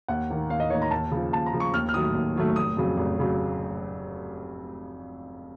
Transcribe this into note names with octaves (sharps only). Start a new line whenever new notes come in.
D#2 F#5
D#3 A#3
D#2 F5
D#5
D#3 A#3 C#5
A#5
D#2 A5
C#3 F3
D#2 A5
A#5
C#3 F3
C#6
D#2 F6
F6
D#3 F#3 A3 D#6
D#2
D#3 F#3 A3
F1 D#6
F2 C#3 F#3
F1
C#3 F#3